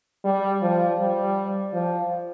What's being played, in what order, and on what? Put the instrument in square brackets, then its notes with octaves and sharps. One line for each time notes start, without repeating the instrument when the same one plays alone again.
[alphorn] G3
F3
G3
F3